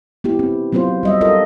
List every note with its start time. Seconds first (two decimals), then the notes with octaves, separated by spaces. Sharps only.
0.24 B3 E4 G4
0.39 C4
0.73 F#3 B3 C4 F4 C5
1.03 G3 D#5 E5
1.21 F4 A4 A#4 D#5 E5